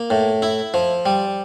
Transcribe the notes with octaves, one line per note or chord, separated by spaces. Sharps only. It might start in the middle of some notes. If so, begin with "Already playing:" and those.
Already playing: A#3
A2
E4
F3
G3